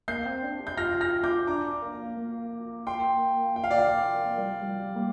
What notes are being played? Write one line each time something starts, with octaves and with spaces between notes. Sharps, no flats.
A#3 G6 C7
C4
D4
G4
G6
F4 F6 A#6
F6 A#6
D6 G6
D4 A#5 D6
A#3
A#3
G5 C6
G5
F5
D5
F5
A#3
G3
G3
A#3